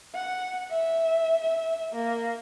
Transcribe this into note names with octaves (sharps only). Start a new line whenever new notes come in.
F#5
E5
E5
A#3